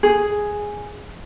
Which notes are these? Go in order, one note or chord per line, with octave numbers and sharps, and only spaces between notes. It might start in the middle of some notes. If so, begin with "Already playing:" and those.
G#4